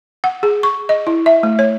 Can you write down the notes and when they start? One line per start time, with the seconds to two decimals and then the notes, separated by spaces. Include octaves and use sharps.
0.24 F#5
0.43 G#4
0.63 C#6
0.89 D#5
1.07 E4
1.26 E5
1.43 A3
1.59 C#5